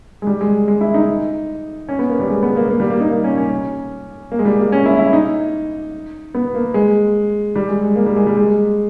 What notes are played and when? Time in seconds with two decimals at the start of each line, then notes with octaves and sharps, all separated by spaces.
0.22 G#3
0.27 G3
0.41 G#3
0.68 G#3
0.81 E4
0.94 D#4
1.89 C#4
1.99 B3
2.09 A#3
2.20 G3
2.30 G#3
2.43 B3
2.56 A#3
2.70 A#3
2.80 G3
2.90 A#3
3.00 D#4
3.10 A#3
3.24 C#4
3.37 C#4
4.32 A#3
4.39 G#3
4.45 G3
4.58 A#3
4.72 C#4
4.86 E4
4.99 E4
5.13 D#4
6.35 B3
6.54 A#3
6.74 G#3
7.56 G3
7.69 G#3
7.82 G#3
7.96 A#3
8.06 G3
8.16 G#3
8.27 G3
8.37 G#3